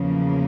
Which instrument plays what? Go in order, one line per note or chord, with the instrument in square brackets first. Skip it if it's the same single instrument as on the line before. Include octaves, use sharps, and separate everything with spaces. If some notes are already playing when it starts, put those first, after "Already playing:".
Already playing: [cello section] E2 C#3 F3 A#3